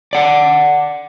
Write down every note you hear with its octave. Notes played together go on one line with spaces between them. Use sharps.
D5 F#5